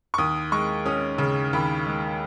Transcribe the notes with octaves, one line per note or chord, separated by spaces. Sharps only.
C#6
D#2 D#6
G#3 C#6
C#4 D#6
C#3
D#2 B5
G#3